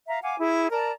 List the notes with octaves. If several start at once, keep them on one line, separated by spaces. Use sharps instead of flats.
E5 F5 A#5
F5 F#5 G#5 D6
E4 G#4
A#4 D5 A5 A#5